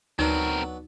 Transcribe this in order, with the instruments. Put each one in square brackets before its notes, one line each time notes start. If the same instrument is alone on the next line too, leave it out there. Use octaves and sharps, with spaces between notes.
[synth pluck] D2 [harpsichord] F#3 B3 D4 [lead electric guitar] C4 A#4 [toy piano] D#4